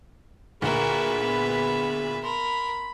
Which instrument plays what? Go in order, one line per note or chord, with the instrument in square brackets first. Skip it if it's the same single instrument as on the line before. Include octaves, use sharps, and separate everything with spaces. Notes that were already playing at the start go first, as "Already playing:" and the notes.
[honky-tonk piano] D2 A#2 [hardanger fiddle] F#4 A#4 [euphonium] G#4 [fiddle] B4 E5
[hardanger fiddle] B3
[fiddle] A#4 [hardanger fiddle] B5 [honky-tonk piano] C6